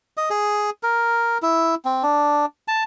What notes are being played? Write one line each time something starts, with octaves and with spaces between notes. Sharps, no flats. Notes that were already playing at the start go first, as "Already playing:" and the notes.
D#5
G#4
A#4
E4
C4
D4
A5